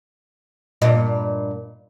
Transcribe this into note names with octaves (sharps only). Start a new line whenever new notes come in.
G2 A#2 D#5